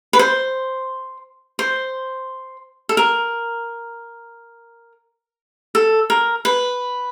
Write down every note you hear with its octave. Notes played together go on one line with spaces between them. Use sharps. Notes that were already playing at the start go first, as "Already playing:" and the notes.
B4
C5
C5
A4
A#4
A4
A#4
B4